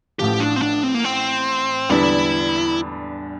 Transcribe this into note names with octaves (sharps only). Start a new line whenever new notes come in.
A1 A2 F3 G4
D4
C4
D4
C4
A#3
C4
E2 D3 G3 D4 E4